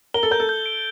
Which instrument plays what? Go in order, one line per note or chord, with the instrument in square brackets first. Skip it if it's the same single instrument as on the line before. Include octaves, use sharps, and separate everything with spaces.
[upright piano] A#4 [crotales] G7
[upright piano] A4
[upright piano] A#4 [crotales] G6
[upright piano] A4
[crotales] G6
D7